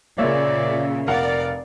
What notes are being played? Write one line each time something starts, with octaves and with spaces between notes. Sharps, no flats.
A#2 C#3 A#3 C#5 D5 E5
F1 A#4 D5 F5 F#5